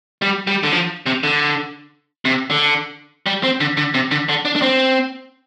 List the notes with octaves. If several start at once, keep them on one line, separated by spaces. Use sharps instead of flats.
G3
G3
D3
F3
C3
D3
C3
D3
G3
C4
D3
D3
C3
D3
D3
D4
D4
C4